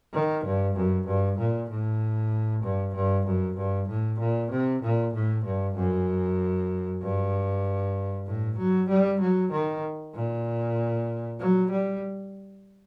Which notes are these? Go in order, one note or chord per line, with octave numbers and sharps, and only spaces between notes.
D#3
G2
F#2
G2
A#2
A2
G2
G2
F#2
G2
A2
A#2
C3
A#2
A2
G2
F#2
G2
A2
F#3
G3
F#3
D#3
A#2
F#3
G3